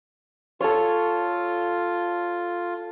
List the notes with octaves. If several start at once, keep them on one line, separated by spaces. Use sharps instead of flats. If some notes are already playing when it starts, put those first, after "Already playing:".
F4 A4 C#5